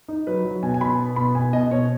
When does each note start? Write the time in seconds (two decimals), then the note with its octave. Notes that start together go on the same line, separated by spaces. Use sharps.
0.08 D#4
0.27 F#3 B4
0.45 F#3
0.63 B2 G#5
0.74 G#5
0.81 B2 B5
1.00 B3
1.16 B2 B5
1.35 B2 G#5
1.53 B2 D#5
1.71 B2 C#5